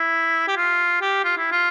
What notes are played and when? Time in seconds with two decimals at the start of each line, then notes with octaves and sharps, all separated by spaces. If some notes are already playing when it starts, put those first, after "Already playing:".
Already playing: E4
0.48 G4
0.56 F4
1.02 G4
1.24 F4
1.38 E4
1.52 F4